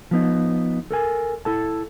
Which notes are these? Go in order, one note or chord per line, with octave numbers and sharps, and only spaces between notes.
F3 B3 D#4
A4 A#4 G#5
E4 A4 A5